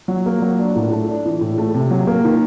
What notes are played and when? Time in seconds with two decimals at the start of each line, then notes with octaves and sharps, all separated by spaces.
0.08 F#3
0.26 A#3
0.42 F#3
0.59 D4
0.76 A2
0.92 A3
1.08 D4
1.25 E3
1.41 A2
1.58 A3
1.74 C3
1.91 F#3
2.07 A#3
2.24 D#3